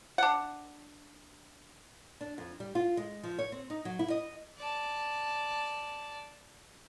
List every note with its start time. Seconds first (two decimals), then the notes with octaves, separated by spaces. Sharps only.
0.18 D4 F#5
2.21 D4
2.38 F2
2.60 G3
2.75 F4
2.97 G#3
3.23 F3
3.39 C#5
3.52 C4
3.70 D#4
3.85 F#3
3.99 E4
4.10 D#5
4.58 D5 A5